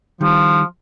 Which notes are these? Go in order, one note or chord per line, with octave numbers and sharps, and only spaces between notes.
D#3 F3 G3